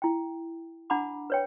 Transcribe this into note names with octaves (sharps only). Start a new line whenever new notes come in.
E4 G5
D4 F#5 A#5 B5 D6
B4 C#5 G5